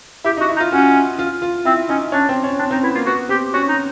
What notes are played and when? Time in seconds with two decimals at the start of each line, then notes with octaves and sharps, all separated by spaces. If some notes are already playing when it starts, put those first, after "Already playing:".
0.24 E4 G4
0.37 D#4
0.41 F#4
0.49 E4
0.56 D#4
0.60 F4
0.72 C#4 F#4
1.19 F4
1.42 F4
1.65 C4 E4
1.89 C#4 D#4
2.12 C#4 D4
2.29 C4
2.44 C#4
2.59 C4 D4
2.71 C4 D#4
2.83 B3 E4
2.95 A#3 F4
3.06 B3 F#4
3.29 C4 G4
3.53 C#4 F#4
3.69 D#4